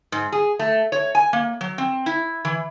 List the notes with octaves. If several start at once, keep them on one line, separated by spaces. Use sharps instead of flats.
G#2
G#4
A3
C#5
G#5
A#3
F#3
C4
E4
E3